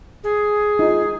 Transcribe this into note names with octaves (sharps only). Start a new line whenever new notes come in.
G#4
D#4 F4